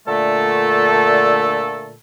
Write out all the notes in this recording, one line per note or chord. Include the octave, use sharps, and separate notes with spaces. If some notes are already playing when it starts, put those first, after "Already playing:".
A#2 D3 A3 A4